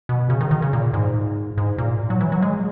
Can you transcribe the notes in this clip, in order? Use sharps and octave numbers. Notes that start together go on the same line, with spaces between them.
B2
C#3
D#3
D#3
C#3
A#2
G#2
G#2
A#2
F#3
E3
F#3
G#3